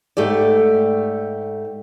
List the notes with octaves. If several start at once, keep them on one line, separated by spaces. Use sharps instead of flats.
G#2 A3 G4 D5